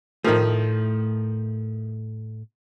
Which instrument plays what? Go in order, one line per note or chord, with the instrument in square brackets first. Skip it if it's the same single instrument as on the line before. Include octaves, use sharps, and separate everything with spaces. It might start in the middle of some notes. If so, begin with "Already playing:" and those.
[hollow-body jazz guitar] A2 A3 [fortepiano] D#3 F3